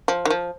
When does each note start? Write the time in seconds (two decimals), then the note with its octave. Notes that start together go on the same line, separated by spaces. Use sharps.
0.08 F3
0.25 D#3
0.30 F3